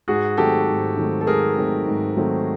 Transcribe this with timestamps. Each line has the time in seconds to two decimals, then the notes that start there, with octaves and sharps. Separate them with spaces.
0.08 G#2 F#4 G#4
0.37 D#3 F#3 A3 C4 G4 A4
0.68 G#2
0.97 D#3 F#3 A3 C4
1.21 A4
1.27 G#2 G#4 A#4
1.57 D#3 F#3 A3 C4
1.87 G#2
2.17 D#3 F#3 A3 C4